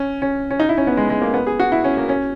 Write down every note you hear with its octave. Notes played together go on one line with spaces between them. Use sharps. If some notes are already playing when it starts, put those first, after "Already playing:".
Already playing: C#4
C#4
C#4
D#4
E4
C#4
B3
G#3
G#3
A#3
B3
G#4
F#4
E4
C#4
A#3
C#4